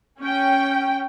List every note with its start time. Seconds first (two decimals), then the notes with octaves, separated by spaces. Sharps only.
0.19 C#4 G5